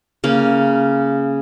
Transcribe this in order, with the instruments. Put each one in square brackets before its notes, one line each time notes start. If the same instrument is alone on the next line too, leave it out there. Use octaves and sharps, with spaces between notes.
[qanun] C#3 A#3